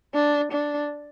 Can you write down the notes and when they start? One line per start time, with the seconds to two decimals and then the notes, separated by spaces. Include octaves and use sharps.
0.14 D4
0.52 D4